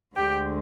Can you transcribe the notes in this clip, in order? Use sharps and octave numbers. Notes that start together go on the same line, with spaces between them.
D2 D3 G#3 G4 G5